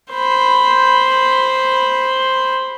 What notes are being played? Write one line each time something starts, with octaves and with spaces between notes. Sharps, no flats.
C5 B5